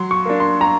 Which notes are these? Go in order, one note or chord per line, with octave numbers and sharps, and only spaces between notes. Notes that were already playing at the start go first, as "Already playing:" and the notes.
Already playing: F#3 C6
C#6
A#3 D4
C6
A#5